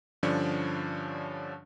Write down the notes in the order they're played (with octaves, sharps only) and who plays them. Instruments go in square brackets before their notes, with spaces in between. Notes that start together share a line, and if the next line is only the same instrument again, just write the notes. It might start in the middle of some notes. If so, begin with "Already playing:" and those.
[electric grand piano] G2 D3 F3 C#4 D4 C#5